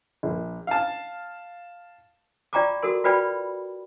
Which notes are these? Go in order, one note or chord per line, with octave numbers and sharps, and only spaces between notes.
A#1
F5 A5
F4 D5 G5 A#5 C#6 D6
F#4 A4 A#4 C6
F4 F#4 B4 D5 G5 B5